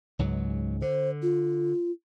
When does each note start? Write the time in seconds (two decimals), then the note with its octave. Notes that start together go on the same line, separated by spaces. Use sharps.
0.19 C#2 G#2 F#3
0.82 D3 C5
1.22 F4